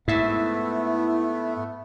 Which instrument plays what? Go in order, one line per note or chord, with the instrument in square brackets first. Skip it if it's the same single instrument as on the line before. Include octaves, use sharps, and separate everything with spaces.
[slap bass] G#2 [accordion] A3 B3 [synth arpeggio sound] E4 E5